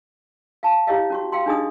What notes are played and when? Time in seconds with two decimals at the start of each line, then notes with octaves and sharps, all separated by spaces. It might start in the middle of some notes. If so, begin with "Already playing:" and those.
0.63 F5 A5
0.87 E4 G4 C#5 D#5 F5
1.10 C#4 F#4 C#6
1.32 F5 G5 C6
1.46 D4 D#4 G#4 D#5 D#6